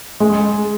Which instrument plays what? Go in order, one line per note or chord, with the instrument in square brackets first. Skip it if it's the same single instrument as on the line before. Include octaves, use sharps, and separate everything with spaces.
[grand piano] G#3